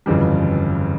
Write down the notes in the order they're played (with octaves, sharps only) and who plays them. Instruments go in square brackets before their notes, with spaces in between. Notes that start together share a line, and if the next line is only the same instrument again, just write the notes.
[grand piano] G1 F2 C#3 E3 G3